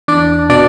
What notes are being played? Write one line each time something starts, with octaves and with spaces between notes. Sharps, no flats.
E2 D4 D5
B2 D4 D5